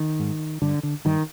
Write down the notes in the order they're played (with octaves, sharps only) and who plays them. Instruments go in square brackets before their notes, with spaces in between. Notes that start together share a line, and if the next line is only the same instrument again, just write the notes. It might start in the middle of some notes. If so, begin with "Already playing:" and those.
Already playing: [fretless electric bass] D#3
G#2
G2 D3
D3
G2 D#3